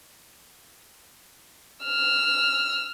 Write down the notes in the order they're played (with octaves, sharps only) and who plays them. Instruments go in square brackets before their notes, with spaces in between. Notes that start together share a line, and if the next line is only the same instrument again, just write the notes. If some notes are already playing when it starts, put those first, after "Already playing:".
[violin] E6 F6